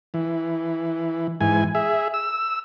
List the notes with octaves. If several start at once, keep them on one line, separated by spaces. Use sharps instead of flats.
E3
G#2 E3 G#5
G#4 E5
E6